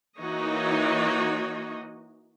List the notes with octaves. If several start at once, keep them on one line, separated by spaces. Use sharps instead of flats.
E3 A#3 D#4 F#4 C#5 D#5